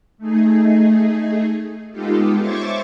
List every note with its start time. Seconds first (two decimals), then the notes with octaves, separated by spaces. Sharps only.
0.18 A3 D#4 G#4
1.91 G#3 B3 D#4 F4 G4 A4
2.40 C5 C#5 E5 C#6 D6 A6